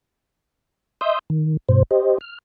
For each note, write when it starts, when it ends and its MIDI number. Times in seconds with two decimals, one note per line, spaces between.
1.01 1.19 75
1.01 1.19 76
1.01 1.19 84
1.01 1.19 87
1.01 1.19 88
1.01 1.19 91
1.30 1.57 51
1.69 1.83 43
1.69 1.83 47
1.69 1.83 72
1.91 2.18 67
1.91 2.18 72
1.91 2.18 75
2.21 2.38 89